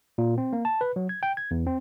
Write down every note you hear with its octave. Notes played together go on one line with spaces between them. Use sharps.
A#2
C4
A#3
A5
B4
F#3
G#6
G5
G#6
E2
C4